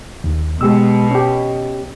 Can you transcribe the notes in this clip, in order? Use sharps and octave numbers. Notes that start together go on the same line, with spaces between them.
D#2
B2 G#3 G4 E6
C#4 G4